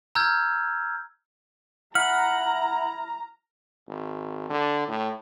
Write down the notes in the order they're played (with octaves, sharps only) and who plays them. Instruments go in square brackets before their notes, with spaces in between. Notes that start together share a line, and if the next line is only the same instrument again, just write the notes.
[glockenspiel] A#5 E6 F6 G6 G#6
[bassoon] E4 [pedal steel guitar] F#5 B5 [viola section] A#5 [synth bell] F6
[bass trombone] G#1
D3
A2